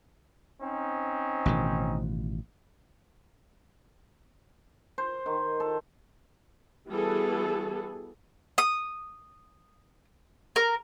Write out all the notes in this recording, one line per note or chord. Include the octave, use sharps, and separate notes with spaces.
C4 C#4 D#4
A1 B2 D#3
C5
D#3
A4
E3 G3 B3 F#4 G#4 A4
D#6
A#4